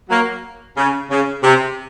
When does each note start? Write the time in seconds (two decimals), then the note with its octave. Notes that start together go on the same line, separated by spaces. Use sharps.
0.10 F#3 A#3
0.77 C#3
1.10 C#3
1.43 C3